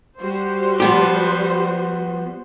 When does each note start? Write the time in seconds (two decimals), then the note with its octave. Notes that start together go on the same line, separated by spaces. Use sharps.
0.19 G3 F#4 C5
0.80 F3 B3 G4